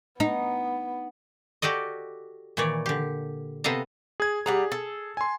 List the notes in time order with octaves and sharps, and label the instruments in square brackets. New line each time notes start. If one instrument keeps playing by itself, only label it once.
[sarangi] B3 [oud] D#4
[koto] F#4 G4 A4 D5 D#5
A#2 D#3 E3 C#5 D5
D3 G4
C3 B3 A4 D#5 F5 A#5
[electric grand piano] G#4 G#6
[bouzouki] G3 F#5 A#5 [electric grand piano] G#4
[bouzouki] A4
[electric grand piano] G#5 C6